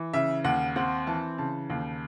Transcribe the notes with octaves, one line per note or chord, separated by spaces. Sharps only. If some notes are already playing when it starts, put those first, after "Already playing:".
Already playing: E3
C#3 E5
D#2 F#5
C4 F#5
E3 A5
C#3 A5
D#2